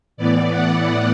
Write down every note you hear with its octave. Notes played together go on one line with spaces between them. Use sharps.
A2 E3 B3 D5
F#5